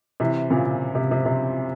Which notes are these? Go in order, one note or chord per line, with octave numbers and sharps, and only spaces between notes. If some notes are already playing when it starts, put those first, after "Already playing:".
C3 E3
A#2 C#3
C3
C3
C3